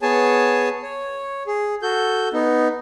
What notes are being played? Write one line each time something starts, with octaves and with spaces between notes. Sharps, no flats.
B3 G#4 C#5 G#5 A5
C#5
G#4
F#4 A4 G6
B3 D#4